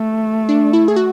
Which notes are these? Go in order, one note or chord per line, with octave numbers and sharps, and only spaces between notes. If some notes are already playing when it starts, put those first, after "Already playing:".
Already playing: A3
D4
E4
G#4
F#4